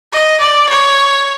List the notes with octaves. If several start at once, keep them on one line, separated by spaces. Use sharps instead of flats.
D#5
D5
C#5